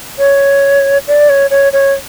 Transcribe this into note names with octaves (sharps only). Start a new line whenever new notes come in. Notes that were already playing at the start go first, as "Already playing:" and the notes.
C#5
D5
C#5
C#5
C#5